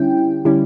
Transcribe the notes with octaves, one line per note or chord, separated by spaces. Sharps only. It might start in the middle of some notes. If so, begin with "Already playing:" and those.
Already playing: D3 G3 C#4 E4 G5
D3 G3 C#4 E4